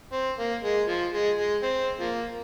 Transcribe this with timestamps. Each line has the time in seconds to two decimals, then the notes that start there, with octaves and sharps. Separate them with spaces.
0.13 C4
0.38 A#3
0.63 G#3
0.88 F3
1.12 G#3
1.37 G#3
1.63 C4
2.00 F3 A#3